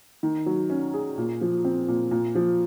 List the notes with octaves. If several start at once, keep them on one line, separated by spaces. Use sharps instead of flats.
D#3
F#3
C#4
G#4
A#2
F3
C4
A#2
A#2
F3